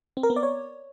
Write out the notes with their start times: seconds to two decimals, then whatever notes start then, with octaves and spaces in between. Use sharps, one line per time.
0.17 C4
0.23 A#4
0.30 B3
0.36 D5
0.43 C#5